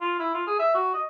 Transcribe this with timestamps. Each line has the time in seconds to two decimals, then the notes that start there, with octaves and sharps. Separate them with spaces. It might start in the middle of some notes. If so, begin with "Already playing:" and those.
0.01 F4
0.19 E4
0.34 F4
0.47 G#4
0.59 E5
0.74 F#4
0.94 D#5